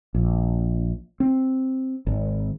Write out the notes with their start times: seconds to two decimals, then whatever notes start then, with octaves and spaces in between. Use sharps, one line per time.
0.15 A#1
1.20 C4
2.07 G#1